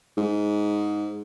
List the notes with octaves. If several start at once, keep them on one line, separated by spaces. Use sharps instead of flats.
G#2